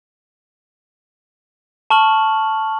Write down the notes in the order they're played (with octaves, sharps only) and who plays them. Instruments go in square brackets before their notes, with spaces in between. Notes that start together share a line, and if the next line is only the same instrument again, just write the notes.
[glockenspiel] A5 C#6 F6 F#7